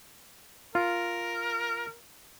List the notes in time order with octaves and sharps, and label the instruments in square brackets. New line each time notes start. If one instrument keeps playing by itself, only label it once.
[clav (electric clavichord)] F4 [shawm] A#4